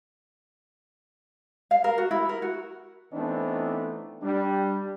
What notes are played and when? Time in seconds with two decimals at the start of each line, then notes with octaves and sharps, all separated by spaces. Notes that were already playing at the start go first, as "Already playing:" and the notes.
1.71 F5
1.84 A#4
1.98 F#4
2.11 E4
2.29 A#4
2.42 F#4
3.13 E3 A3 B3 C4 D4 D#4
4.23 G3 D4